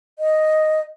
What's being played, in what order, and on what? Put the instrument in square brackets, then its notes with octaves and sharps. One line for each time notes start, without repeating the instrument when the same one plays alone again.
[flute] D#5